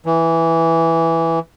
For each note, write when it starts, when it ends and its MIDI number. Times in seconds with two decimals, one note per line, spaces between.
0.06 1.39 52